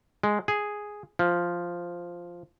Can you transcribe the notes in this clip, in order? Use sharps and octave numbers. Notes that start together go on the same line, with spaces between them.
G#3
G#4
F3